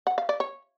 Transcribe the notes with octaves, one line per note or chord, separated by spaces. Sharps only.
F#5
F5
D5
C#5